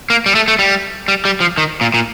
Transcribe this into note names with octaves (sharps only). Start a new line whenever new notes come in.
A#3
G3
A3
A3
G3
G3
G3
F3
D#3
A#2
A#2